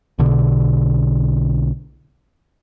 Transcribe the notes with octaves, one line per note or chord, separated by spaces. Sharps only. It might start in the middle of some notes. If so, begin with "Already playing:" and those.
B1 B2 D3